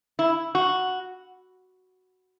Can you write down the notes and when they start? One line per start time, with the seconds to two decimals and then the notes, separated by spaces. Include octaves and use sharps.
0.19 E4
0.55 F#4